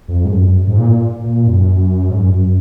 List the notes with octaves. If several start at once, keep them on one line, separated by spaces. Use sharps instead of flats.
F2
G#2
F#2
G#2
A#2
A#2
F#2
G#2
F#2